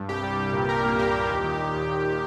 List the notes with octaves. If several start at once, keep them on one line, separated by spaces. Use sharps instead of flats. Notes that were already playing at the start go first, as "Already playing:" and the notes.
Already playing: G2
C2 G4
G3
C2
A#2
A#2 A#4
A#3
C2 G4
A#2
D#2
D#3
D#3
D#2
D#2